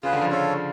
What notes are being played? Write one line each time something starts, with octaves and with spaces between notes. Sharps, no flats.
C#3 F4 G#4 B4
D3
F3
C#3 F4 A4 C#5